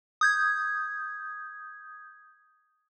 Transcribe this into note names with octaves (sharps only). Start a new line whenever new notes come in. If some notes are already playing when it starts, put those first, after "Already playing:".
D#6 G6 G#6